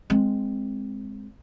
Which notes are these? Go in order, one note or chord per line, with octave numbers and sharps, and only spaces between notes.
G#3 C4